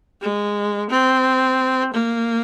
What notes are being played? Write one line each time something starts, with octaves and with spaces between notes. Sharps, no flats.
G#3
C4
A#3